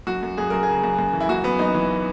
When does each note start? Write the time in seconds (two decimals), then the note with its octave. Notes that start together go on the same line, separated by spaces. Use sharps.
0.07 F#2 F#4
0.23 F#2
0.38 F#2 G#4
0.50 F#2 A#4
0.63 G#4
0.68 C#3
0.84 F#2
0.99 F#2
1.13 E3
1.20 E4
1.29 F#2 F#4
1.44 F#2 B3
1.59 F#2 D#4
1.74 E3